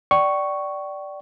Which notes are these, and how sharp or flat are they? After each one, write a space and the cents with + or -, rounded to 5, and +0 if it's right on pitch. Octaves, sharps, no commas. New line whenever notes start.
D5 +0 G5 -35 C#6 +0